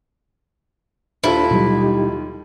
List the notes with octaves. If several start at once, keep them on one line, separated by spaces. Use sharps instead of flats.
D#2 D4 E4 F4 A4 C5
B2 F#3 G3 D#4 G4